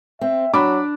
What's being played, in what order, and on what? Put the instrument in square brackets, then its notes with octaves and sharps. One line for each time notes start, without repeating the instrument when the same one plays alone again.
[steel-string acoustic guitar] C4 [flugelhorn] E5
[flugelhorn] F#3 [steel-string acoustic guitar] D4 [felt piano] B5 D6